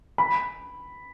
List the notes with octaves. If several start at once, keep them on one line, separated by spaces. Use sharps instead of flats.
B5